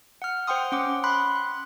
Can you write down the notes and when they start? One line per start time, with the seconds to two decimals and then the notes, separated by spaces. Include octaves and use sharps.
0.22 F#5 F6
0.47 C5 F#5 G5 C6 D#6
0.72 C#4 F#5 D6
1.04 B5 C6 F#6